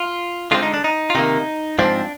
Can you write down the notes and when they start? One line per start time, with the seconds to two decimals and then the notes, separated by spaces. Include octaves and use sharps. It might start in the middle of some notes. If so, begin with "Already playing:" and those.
Already playing: F4
0.51 D3 G#3 C4 F4
0.62 D#4
0.74 D4
0.84 D#4
1.10 F4
1.15 C3 D#3 A#3 D#4
1.79 G#2 F3 C4 D4